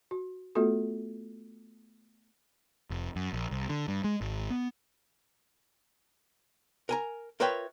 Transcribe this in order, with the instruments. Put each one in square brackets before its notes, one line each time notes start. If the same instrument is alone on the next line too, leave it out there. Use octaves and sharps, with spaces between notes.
[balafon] F#4
A3 B3 F4 F#4 A4
[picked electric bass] F1
F#2
A#1
C2
D3
G2
G#3
G#1
B3
[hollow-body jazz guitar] A#4 G#5 A#5
F4 A#4 B4 C#5 E5 G5